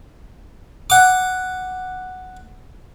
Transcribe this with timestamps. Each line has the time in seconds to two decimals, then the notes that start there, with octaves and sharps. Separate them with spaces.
0.90 F#5 D6